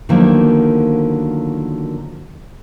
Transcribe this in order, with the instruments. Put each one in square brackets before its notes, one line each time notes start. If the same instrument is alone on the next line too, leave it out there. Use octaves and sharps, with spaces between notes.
[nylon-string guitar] D3 D#3 F3 F#3 A#3 B3